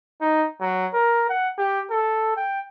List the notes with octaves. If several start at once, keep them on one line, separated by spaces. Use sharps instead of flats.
D#4
F#3
A#4
F#5
G4
A4
G5